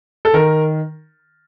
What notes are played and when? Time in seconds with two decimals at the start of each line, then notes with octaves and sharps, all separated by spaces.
0.25 A4
0.34 D#3 A#4